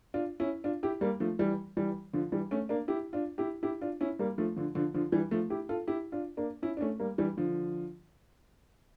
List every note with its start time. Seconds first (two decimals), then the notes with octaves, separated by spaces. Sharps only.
0.14 D4 F4
0.40 C#4 E4
0.64 D4 F4
0.83 E4 G4
1.01 G3 A#3
1.20 F3 A3
1.39 E3 G3
1.77 E3 G3
2.13 D3 F3
2.32 E3 G3
2.51 A3 C#4
2.69 A#3 D4
2.88 E4 G4
3.13 D4 F4
3.38 E4 G4
3.63 E4 G4
3.81 D4 F4
4.01 C#4 E4
4.19 G3 A#3
4.38 F3 A3
4.56 D3 F3
4.75 D3 F3
4.94 D3 F3
5.12 E3 G3
5.31 F3 A3
5.50 E4 G4
5.69 F4 A4
5.87 E4 G4
6.12 D4 F4
6.37 A#3 D4
6.62 C#4 E4
6.77 D4
6.81 A3 C#4
7.00 G3 A#3
7.18 E3 G3
7.37 D3 F3